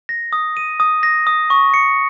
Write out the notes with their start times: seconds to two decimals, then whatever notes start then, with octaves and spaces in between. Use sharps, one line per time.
0.09 A#6
0.33 D#6
0.57 D#7
0.80 D#6
1.03 A#6
1.27 D#6
1.50 C#6
1.74 C#7